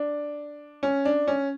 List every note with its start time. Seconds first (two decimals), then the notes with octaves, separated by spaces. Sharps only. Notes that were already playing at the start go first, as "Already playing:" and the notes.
Already playing: D4
0.83 C#4
1.05 D4
1.28 C#4